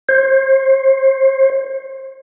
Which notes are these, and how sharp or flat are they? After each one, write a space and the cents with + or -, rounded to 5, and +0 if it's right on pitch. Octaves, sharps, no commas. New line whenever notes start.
C5 +35